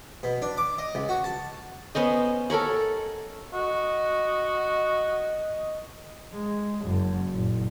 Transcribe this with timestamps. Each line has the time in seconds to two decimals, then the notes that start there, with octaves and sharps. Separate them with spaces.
0.23 B2
0.42 D4
0.57 D6
0.78 D#5
0.95 C#2
1.09 F#4
1.24 A5
1.95 B3 C#4 C5 D#5
2.50 A4 A#4 C#5 F#5
3.54 F#4 D#5
6.33 G#3
6.85 F#1 F#2
7.31 F#1 A#2